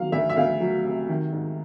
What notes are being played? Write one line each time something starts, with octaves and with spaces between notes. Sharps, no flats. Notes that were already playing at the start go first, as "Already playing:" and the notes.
Already playing: D#3 F#3 F5
D2 E5
E5
D2 F5
F#3
C3
D#3
G#2